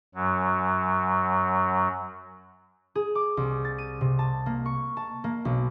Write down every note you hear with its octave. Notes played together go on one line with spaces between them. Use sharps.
F#2 F#3
G#4
D6
C2
A6
D#7
C3
A5
A#3
C#6
A5
A#3
B1